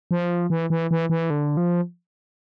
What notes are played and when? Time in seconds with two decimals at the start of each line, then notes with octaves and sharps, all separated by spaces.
0.11 F3
0.50 E3
0.70 E3
0.91 E3
1.10 E3
1.30 D3
1.57 F3